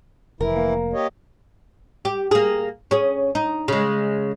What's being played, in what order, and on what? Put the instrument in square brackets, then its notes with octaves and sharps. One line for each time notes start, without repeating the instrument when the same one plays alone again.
[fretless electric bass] F1 [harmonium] E3 E4 [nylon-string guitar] A#4
[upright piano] A#3
[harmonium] G4 C#5 D#5
[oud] G4
A#3 G#4
C#4 G#4
D#4
C#3 G#3